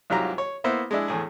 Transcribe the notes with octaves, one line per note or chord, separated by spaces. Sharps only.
C2 G#2 F#3 F4 G4 A#5
C#5
A#3 B3 E4 C5
G#3 D4 E4
E2 A2 G#4